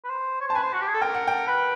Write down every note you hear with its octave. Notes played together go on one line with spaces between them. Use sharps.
B4
C5
C#5
C5 A5
B4 G#5
C5
F#4
G4
G#4
A4
A#4 G5
F#5
G5
B4